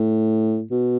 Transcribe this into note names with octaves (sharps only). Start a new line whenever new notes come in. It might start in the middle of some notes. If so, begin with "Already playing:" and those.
Already playing: A2
B2